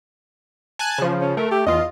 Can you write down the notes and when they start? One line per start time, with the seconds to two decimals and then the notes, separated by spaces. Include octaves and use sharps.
0.79 G#5 A5 F#6
0.98 C#3 F3
1.21 C#4
1.37 A3 A#4
1.51 G4
1.66 E2 F4 D#5